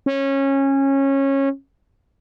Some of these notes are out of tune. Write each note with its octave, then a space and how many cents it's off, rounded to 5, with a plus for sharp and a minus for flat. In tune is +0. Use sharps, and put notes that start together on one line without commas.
C#4 -20